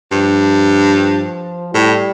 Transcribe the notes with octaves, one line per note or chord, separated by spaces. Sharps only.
G2 F3
A2 G3